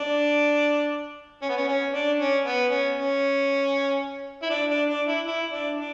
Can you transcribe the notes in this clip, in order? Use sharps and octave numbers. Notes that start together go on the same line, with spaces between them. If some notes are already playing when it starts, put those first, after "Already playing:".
Already playing: D4
C#4
B3
C#4
C#4
D4
C#4
B3
C#4
C#4
E4
D4
D4
D4
E4
E4
D4
D4